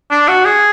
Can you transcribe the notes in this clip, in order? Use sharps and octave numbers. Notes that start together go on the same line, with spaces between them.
D4
F#4
G#4